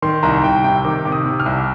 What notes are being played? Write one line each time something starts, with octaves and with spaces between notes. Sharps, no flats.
D#3 C6
C2 A#5
C2 G5
C3 G5
D#3 D6
C3 D6
D#6
C3
F6
C2